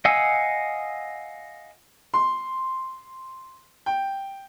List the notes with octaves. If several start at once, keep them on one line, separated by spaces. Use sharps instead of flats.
D#5 F5 F#5 G#5 E6
C6
G5